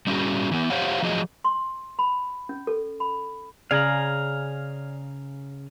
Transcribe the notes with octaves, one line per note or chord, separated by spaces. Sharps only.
G3 C#4 E4 F#4 G#4
E3 B3
G4 C5 C#5 F5 F#5
F3 F#3 G#4 D#5
C6
B5
C#4
A4
B5
C#3 D5 F5 G#5 A#5 F6 F#7